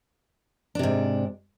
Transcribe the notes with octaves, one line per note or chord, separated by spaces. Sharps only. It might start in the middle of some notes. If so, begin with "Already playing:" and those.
G#2 C3 D4